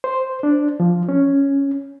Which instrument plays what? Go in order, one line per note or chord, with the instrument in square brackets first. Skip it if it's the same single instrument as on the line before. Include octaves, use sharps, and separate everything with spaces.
[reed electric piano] C5
D4
F3
C#4